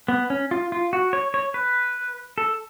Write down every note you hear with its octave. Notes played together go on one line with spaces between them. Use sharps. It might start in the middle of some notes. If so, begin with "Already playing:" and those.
B3
C#4
F4
F4
F#4
C#5
C#5
B4
A4